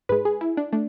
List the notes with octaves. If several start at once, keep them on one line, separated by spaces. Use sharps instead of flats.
G#2 G#3 B4
G#4
E4
D4
A3 D4